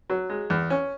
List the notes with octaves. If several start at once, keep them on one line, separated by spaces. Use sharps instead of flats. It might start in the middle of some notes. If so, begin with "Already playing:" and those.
F#3
G#3
E2
C#4